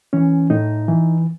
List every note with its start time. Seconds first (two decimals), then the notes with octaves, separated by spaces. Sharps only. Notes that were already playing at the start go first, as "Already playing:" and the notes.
0.13 E3 C#4
0.50 A2 D#4
0.88 E3